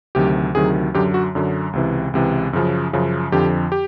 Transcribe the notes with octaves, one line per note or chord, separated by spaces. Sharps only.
D2 C3 D#3 F#3 G4
D2 C3 D#3 F#3 G#4
F#2 D3 F#3 G4
F#4
F#2 D3 F#3
C#2 C3 E3
C#2 C3 E3
F#2 C#3 F3
F#2 C#3 F3
F2 D3 F3 G4
G4